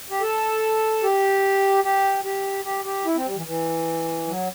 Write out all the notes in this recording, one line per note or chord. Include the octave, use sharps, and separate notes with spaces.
G4
A4
G4
G4
G4
G4
G4
E4
C4
G3
E3
E3
F#3